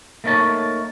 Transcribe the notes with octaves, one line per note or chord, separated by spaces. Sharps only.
A3 A#3 D#4 C#5 A5